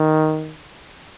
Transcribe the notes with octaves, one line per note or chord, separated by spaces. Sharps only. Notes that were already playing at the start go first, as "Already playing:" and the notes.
Already playing: D#3